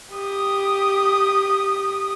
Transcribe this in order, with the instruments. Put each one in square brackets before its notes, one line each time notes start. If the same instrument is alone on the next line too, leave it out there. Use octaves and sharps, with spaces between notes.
[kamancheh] G4 D#6